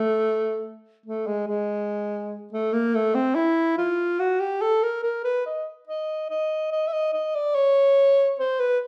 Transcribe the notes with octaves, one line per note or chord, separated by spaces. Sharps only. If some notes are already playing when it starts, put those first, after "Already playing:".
Already playing: A3
A3
G#3
G#3
A3
A#3
A3
C4
E4
F4
F#4
G4
A4
A#4
A#4
B4
D#5
D#5
D#5
D#5
E5
D#5
D#5
D5
C#5
C5
B4